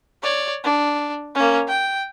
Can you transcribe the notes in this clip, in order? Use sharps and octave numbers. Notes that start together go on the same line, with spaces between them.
C#5 D5
D4
A#3 C#4
G5